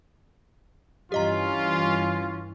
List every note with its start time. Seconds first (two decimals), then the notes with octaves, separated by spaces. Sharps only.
1.12 G2 E3 C#4 F4 G4 D#5 A#5